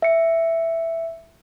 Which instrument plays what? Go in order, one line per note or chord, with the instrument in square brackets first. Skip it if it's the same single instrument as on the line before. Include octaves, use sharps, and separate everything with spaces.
[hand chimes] E5 C#7